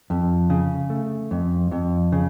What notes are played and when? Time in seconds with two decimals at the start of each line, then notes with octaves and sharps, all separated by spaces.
0.10 F2
0.50 C#3
0.90 A3
1.31 F2
1.71 F2
2.12 C#3